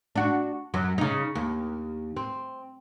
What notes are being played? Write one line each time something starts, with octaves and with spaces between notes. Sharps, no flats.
D4 F#4
F#2 F#3
C#3 D#4
D#2
C4